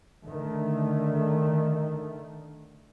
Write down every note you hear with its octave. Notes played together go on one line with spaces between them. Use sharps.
D3 D#3 A3